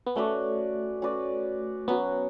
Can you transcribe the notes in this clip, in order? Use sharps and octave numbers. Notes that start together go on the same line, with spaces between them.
B3
A3 C#4 F#4 B4 D5
C#4 F#4 B4 D5
F#3 B3 C#4 F#4 B4